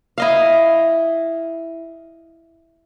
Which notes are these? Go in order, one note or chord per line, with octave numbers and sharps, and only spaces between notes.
E4 D#5 F5